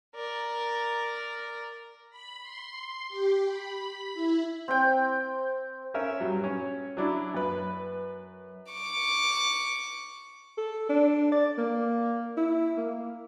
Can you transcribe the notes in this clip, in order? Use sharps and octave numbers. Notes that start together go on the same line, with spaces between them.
A#4 D5
B5
C6
G4
B5
B5
E4
C4 G5
C#4 A#4 E5
G2 F#3
C#4
F#3 D4 E4
F#2 B4
C#6 D6
A4
D4
D5
A#3
E4
A#3